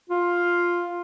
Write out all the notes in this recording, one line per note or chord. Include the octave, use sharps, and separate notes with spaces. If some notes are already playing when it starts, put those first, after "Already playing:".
F4